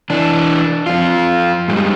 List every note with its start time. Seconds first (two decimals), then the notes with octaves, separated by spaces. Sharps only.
0.10 E3 D4
0.86 F2 F4
1.68 G#2 G3 G#3